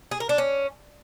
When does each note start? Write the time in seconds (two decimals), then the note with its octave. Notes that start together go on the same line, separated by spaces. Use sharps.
0.11 G#4
0.20 A#4
0.29 D4
0.38 C#4